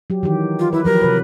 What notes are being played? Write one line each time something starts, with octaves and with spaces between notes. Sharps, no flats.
F#3 G4
D#3 E3 G4
F4
E4 B4
F3 F#3 G4 A#4
C3 B4